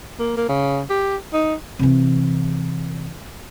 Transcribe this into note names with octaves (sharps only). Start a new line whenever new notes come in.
A#3
A#3
C#3
G4
D#4
C3 E3